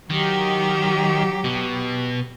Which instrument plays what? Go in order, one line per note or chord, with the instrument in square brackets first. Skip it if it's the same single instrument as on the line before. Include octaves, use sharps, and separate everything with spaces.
[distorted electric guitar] D#3 [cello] F#3 G4
[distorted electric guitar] B2